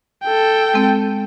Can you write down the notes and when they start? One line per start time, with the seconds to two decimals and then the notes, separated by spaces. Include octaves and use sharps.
0.23 A4 G5
0.74 G#3 C4